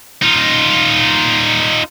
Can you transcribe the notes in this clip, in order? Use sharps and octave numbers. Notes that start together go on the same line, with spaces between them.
D#4 F4